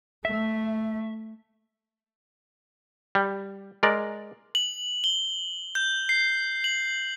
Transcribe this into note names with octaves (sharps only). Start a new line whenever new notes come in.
A3 E5
G3
G#3 A#4 D5
F#7
G7
G6
C7
F#7